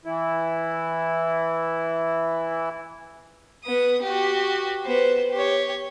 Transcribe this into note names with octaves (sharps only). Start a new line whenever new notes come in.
E3 E4
B3 D#6
F#4 G4
B3 C5
G4 C#5